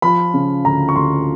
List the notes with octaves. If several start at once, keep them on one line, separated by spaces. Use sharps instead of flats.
F3 B5
C#3
D2 A#5
C#6
D2 C6